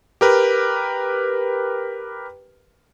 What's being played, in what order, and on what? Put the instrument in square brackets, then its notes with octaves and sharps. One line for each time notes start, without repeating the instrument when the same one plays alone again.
[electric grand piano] G4 A#4 B4